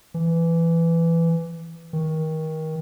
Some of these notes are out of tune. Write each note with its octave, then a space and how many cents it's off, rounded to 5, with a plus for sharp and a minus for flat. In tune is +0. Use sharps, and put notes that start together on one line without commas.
E3 +15
D#3 +25